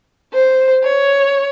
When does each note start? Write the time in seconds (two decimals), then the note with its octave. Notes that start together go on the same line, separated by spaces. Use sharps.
0.33 C5
0.83 C#5